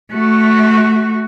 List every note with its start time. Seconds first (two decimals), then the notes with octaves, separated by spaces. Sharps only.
0.12 A3 F#4